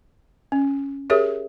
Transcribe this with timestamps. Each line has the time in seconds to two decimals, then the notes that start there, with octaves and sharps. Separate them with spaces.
0.52 C#4
1.10 G4 G#4 A#4 C#5 E5